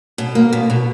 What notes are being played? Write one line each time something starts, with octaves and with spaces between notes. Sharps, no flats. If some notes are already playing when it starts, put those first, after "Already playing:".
B2
A#3
B2
B2